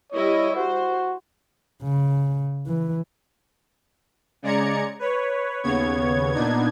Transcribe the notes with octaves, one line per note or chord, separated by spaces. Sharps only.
G3 E4 C#5 D#5
F#4 C5
C#3
E3
C#3 G#3 D5 A#5 G#6 C#7
B4 C#5
D#2 C#3 B3 C#5 G#6
A#2 B3 D4 D#4 G#6